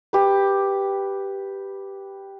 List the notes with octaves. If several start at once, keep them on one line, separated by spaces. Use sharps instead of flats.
G4 B4